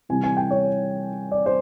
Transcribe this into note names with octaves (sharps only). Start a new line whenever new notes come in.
C3 E3 G3 C4 G#5
G#5
G5
C#5
D5
C5